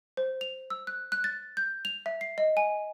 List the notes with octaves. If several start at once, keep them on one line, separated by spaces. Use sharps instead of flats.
C5
F7
E6
F#6
F#6
A6
G6
F7
E5
C7
D#5
G#5